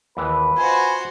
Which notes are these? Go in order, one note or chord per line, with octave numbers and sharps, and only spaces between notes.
D#2 E3 G#3 B4
F4 F#4 C5 D#5 G#5